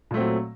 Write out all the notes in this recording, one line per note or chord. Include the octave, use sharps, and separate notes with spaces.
A#2 F#3 A3 C4